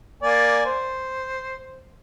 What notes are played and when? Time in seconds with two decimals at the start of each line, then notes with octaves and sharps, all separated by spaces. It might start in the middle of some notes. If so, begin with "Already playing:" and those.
0.23 A#3 D5 G#5
0.66 C5